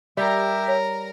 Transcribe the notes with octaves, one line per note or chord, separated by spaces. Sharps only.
G3 G4 A#4 E5 A#5
C#5